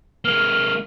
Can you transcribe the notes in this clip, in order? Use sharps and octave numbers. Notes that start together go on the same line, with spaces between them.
G#3 A#3 F6